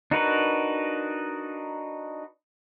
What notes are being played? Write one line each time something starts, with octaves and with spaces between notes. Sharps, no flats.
D4 D#4 F#4 A#4 B4